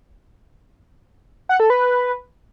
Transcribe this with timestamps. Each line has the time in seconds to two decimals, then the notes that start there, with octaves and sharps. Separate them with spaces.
1.49 F#5
1.60 A4
1.70 B4